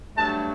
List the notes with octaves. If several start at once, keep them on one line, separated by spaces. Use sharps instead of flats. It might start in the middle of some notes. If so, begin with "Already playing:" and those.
G2 F#3 A3 A5